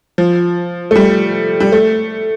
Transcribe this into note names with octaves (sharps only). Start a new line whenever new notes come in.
F3
A3
G3
G3
A3